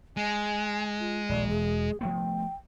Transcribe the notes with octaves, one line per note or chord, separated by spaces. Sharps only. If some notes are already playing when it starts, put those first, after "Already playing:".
G#3 G#5
F4
D#1 A#1 D5
E1 G#4
F3 A3 B3 G5